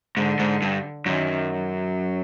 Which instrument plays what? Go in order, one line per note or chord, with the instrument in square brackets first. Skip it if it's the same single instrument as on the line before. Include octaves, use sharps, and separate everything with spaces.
[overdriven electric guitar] G#2 [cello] D3
[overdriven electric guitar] G#2
G2
[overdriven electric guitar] F#2 [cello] D#3
[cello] F#3